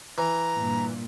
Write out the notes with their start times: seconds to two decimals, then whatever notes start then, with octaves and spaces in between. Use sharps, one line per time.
0.18 E3 A#5
0.57 G2 A#2